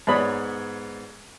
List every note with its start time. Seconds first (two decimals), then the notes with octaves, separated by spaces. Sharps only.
0.07 G#2 B3 C#5 D5 B5 D#6